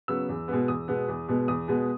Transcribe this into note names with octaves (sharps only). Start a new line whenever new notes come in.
C#3 F#3 B3 E6
E2
B2 G#3 B3
E2 D#6
B2 G#3 B3
E2
B2 G#3 B3
E2 D#6
B2 G#3 B3